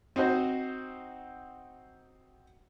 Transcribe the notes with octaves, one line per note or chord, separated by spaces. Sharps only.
C4 D#4 F#4 C5